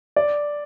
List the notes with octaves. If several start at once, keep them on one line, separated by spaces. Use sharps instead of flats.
D5